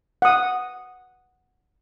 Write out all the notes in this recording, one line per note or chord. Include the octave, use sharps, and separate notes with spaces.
F#5 D#6